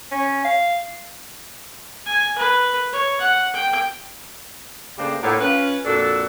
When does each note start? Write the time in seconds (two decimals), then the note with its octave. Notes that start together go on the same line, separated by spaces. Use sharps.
0.11 C#4
0.45 F5
2.06 G#5
2.38 B4
2.93 C#5
3.21 F#5
3.54 G5
4.98 C#3 A3 A#3 D4 G4 C5
5.22 A2 A#3 B3 D4 F4 C#5
5.40 C#4 F4 B4
5.85 F2 A#2 D4 F#4 A4